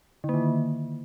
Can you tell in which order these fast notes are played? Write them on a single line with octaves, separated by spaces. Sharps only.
D3 A#3 D#3